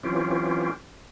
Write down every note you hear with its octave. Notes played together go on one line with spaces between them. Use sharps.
E3 F#3 C4 C#4 F4 G4